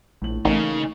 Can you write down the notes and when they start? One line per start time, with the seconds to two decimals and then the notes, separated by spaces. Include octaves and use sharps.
0.22 A#1 A2 F#7
0.45 A1 C#3 A3 A#3 D#4 A#4